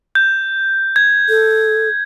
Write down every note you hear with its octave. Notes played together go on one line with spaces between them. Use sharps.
G6
G#6
A4